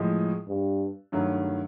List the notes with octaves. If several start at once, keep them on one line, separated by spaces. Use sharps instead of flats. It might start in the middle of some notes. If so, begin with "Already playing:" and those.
Already playing: A2 F3 G#3
G2
G2 D#3 F#3 A3